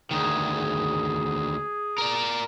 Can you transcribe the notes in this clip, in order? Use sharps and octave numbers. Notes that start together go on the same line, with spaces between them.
D2 D#3 G#4
A#4 D5